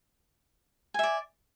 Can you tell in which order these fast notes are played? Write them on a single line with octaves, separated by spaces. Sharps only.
G#5 E5 D5